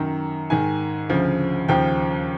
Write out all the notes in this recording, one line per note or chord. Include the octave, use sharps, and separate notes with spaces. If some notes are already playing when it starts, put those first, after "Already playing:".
Already playing: F#2 D#3
G#2 D#3 G#5
D2 C#3 F3
D#2 C#3 F3 G5